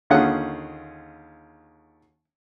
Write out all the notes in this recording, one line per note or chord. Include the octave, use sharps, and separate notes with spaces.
D#2 D3 C#4 F4 G#4 F#5